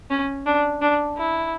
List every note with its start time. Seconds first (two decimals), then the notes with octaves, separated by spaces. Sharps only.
0.10 C#4
0.46 D4
0.82 D4
1.17 E4